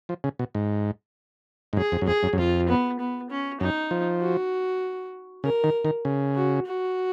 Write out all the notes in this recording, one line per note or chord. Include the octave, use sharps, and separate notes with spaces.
F3
C#3
B2
G#2
G#2
F#2 G#4
F2
F#2
F2 G#4
F#2
F#2
F2 F4
B3
B3
C#4
F#2 D#4
F3
F#4
C#3 A#4
D#3
D#3
C#3
F#4
F#4